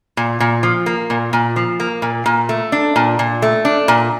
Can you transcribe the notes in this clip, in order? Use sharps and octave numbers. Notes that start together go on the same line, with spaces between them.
A#2
A#2
F3
A#3
A#2
A#2
F3
A#3
A#2
A#2
A3
D4
A#2
A#2
A3
D4
A#2